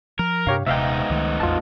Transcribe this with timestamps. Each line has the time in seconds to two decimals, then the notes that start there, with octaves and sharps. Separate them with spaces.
0.19 F3 A#4
0.47 G2 C3 D4 G4 C#5 F5
0.67 D#1 G#2 C3 B3 D#4 E5 F5 G5
1.10 C#2 D#3 A3
1.40 A1 E2 F4 A5